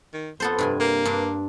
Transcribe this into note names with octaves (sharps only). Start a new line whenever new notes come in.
D#3
F2 B3 A4 C5
G2 C3 G#5
A#3
G2 D4